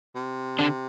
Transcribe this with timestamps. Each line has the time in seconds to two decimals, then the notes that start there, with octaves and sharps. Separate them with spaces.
0.16 C3
0.59 D3 D4